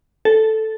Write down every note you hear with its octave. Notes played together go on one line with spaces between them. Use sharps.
A4